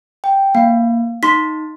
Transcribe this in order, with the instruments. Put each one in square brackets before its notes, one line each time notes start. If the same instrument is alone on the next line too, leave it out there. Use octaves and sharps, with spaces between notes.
[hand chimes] G5
[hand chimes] A#3 [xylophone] F5
[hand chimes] D#4 [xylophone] C6 B6